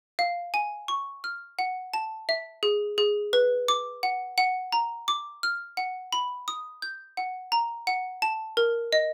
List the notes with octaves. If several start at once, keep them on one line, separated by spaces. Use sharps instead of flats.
F5
G#5
C#6
F6
F#5
A5
E5
G#4
G#4
B4
D6
F#5
F#5
A#5
D6
F6
F#5
B5
D#6
G6
F#5
A#5
F#5
A5
A#4
D#5